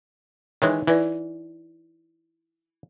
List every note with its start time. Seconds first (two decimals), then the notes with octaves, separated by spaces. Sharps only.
0.62 D#3 E3 G#3 D#4 C#5
0.87 E3 E4 B4 D5